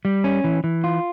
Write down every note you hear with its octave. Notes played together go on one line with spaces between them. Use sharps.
G3
C#4
E3
E3
F4